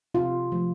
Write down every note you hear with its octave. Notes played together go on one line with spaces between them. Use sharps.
C3 F4
F3 A3